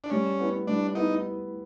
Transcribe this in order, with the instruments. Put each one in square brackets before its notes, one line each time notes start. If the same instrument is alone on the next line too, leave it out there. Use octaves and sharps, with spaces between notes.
[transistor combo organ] D4
[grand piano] G3 [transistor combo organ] C#4
[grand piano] B3 E4
[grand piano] G3 [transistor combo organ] D4
[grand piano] B3 E4 [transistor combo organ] D#4